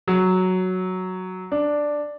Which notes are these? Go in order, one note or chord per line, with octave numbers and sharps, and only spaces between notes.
F#3
D4